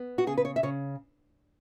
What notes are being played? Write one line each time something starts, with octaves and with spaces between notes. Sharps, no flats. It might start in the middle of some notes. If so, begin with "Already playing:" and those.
Already playing: B3
F#4
C#3 G#4
B4
C#5
E5
C#3 C#5